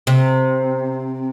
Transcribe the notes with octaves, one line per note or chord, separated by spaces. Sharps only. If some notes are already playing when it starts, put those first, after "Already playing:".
C3